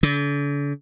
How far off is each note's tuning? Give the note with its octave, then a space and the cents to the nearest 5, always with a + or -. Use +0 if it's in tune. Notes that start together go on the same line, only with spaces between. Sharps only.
D3 -40